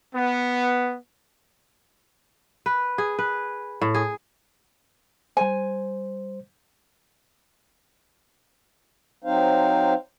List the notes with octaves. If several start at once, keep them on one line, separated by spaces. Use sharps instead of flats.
B3
B4
G#4
B4
A2
G#4
G3 C5 G#5
F#3 C4 D#4 C5 F5